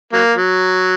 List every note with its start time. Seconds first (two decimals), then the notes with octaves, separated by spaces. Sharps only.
0.13 F#3 A#3
0.35 F#3